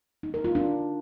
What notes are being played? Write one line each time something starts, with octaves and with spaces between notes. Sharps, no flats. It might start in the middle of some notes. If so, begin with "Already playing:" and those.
D#4
A#4
F4
D4